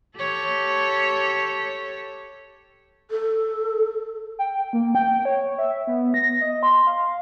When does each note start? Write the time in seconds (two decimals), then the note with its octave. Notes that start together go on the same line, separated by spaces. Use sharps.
0.17 G4 A4 C#5
3.11 A4
4.39 G5
4.73 A#3
4.95 G5
5.25 C#5
5.58 E5
5.87 B3
6.14 A#6
6.41 D#5
6.63 C6
6.87 F5